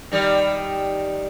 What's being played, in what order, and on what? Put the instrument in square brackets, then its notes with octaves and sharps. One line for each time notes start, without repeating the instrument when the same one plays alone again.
[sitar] D#3 G3